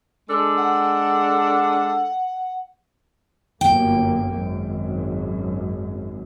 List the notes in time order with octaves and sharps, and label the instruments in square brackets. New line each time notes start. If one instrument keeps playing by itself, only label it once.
[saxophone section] G#3 D4 A4
[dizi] F#5
[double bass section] G1 F#2 A#3 [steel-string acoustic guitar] G5
[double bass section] G#1 F#2